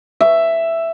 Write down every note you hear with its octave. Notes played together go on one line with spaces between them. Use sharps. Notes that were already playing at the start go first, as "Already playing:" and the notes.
E5